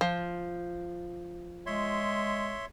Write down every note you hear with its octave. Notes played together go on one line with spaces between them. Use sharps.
F3
G#3 C#5 E5 C6